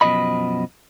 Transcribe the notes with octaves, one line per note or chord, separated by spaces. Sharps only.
F#2 B2 E3 F3 D#5 B5